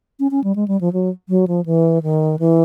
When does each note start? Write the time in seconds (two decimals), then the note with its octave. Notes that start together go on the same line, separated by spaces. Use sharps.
0.20 C#4
0.31 C#4
0.44 G3
0.56 G#3
0.68 G3
0.81 F3
0.93 F#3
1.29 F#3
1.48 F3
1.66 E3
2.03 D#3
2.39 E3